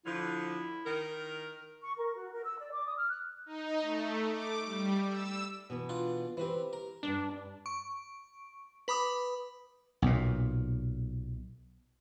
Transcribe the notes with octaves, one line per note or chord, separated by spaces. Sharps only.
D3 F3 E4
D#3 A#4
C#6
A#4
F#4
A#4
E6
D5
D6
D#6
F6
F#6
D#4
A3
D6
G3
E6
B2 E3
D4 F4
E3 C4 G4 B4 C5
A#4
D2 G2 D4
C#6 D7
B4 B5 D6 D#6
B1 A#2